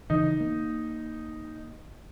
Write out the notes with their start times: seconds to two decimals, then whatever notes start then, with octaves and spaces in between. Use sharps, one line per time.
0.10 C#3 E3 D#4
0.40 A#3